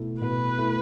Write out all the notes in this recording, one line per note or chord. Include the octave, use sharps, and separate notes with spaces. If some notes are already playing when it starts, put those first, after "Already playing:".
Already playing: B2 A3 E4
B2 B4
A3 E4